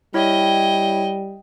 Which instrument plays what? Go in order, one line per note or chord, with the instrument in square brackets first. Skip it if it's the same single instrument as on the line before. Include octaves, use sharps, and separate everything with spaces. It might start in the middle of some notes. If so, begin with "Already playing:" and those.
[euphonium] G3 [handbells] E4 C#5 E5 [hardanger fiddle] D#5 G5